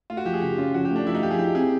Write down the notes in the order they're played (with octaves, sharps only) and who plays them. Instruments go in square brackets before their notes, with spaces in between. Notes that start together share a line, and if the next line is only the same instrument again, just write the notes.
[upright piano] A3 [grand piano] F4
[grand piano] F#4
[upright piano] F3 [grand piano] G4
[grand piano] G#4
[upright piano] C#3 [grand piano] G4
[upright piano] C#4 [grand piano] F4
[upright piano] F3 [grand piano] F#4
[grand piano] G4
[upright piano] A3 [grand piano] D4
[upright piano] F3 [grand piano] E4
[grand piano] D#4
[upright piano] F3 [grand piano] G4
[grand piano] G#4
[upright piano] E4 [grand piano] G4
[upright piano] C4 [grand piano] G#4